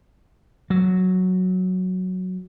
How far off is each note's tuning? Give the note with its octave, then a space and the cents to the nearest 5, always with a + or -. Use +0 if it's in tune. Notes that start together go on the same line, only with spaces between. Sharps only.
F#3 -5